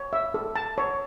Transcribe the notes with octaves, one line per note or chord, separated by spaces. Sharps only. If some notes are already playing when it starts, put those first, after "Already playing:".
Already playing: C#5
E5
A4
A5
C#5